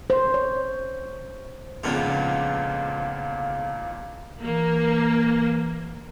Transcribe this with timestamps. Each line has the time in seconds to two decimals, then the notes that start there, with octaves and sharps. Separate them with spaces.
0.10 C5
0.34 C#5
1.83 A#1 F2 G#2 C#3 B3 F4 F5
4.43 E3 A#3